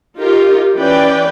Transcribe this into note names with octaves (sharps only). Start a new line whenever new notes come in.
D#4 F4 G4 A#4
E3 C#4 B4 D5 G5